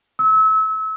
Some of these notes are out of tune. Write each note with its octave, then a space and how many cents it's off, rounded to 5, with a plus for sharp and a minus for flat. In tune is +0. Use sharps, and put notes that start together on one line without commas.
E6 -30